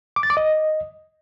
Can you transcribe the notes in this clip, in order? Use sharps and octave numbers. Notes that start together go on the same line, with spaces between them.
D6
A6
D6
D#5